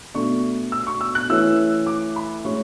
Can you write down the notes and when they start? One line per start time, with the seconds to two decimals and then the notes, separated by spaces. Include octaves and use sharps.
0.14 B2 A3 D4 C#6
0.72 E6
0.87 C#6
1.01 E6
1.15 F#6
1.30 E3 A3 C#4 E4 E6
1.86 D6
2.16 B5
2.45 A2 G#3 C#4 C#6